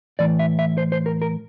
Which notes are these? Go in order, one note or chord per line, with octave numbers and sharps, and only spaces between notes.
A2 E3 D5
E5
E5
C5
C5
A#4
A#4